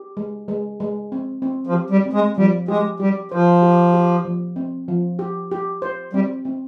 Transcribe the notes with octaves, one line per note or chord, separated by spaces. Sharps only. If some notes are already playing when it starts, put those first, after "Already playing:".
Already playing: G4
G#3
G#3
G#3
C4
C4
F3
G4
G3
C4
G#3
F3 G3
G#3 G4
G3 G4
F3 C5
G4
G4
F3
C4
F3
G4
G4
C5
G3 C4
C4